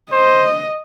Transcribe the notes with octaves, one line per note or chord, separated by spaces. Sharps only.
C5 D#5